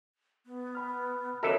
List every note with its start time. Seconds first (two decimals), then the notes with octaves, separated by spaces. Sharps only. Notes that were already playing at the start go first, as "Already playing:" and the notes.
0.46 B3
0.75 B5 F6
1.43 E3 E4 F#4 A4 A#4 C#5 D#5 E5